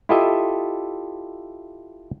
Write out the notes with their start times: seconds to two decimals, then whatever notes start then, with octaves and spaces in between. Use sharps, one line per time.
0.09 E4 F4 G4 A4 D#5 E5